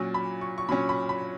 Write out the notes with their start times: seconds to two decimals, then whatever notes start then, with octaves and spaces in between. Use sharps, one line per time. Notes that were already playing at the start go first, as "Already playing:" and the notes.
Already playing: A#2 F#3 C#4
0.14 B5
0.41 C#6
0.58 C#6
0.69 A#2 F#3 C#4 B5
0.89 B5
1.09 B5